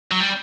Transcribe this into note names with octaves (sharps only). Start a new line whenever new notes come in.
F#3
G3